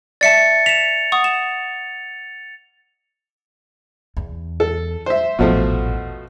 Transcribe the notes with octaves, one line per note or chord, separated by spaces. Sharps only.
D5 E5 A5 A6 C#7
B6 E7 F7
F#5 C#6 D#6
E7
E2
A4
C5 E5
D#1 A1 B2 F3 A3